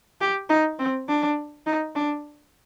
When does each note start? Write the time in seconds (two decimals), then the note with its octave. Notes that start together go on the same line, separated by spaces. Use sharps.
0.21 G4
0.49 D#4
0.79 C4
1.08 D4
1.66 D#4
1.95 D4